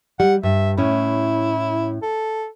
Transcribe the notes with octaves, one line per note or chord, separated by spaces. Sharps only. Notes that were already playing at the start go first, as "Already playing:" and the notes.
G3 F#5
G2 E5
A2 C#4 E4
A4